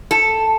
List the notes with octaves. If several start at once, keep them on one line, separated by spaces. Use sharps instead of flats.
A4